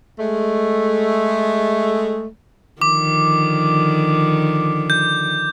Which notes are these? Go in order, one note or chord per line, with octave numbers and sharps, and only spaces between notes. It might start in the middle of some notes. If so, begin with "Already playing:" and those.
G#3 A3
D3 D#3 F3 D6
G6